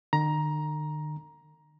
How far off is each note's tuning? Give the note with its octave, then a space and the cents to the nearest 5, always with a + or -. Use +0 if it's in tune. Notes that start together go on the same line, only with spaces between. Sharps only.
D#3 -45 A#5 +15